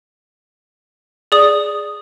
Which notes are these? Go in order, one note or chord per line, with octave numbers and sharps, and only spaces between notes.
G#4 D5 D#6